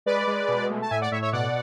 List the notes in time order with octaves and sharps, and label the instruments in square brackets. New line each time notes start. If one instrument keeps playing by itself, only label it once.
[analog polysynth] G#3 B4 D5
G#3
B2
A3
A5
A2 E5 G#5
D5 F#5
A2 C#5 E5
C#5 E5
B2 D5 F#5